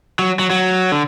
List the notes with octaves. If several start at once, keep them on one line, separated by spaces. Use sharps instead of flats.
F#3
F#3
F#3
D3